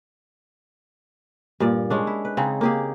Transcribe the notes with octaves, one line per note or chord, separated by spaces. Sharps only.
G2 A#2 D5
G#3 C#4 D4
E4
B4
C#3 C4 D#4 G#4
A#3 G4 G#4